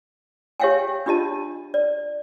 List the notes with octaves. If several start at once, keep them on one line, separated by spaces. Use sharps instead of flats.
G4 C#5 E5 F5 G5 G#5
D4 F4 G4 D#5 A5
D5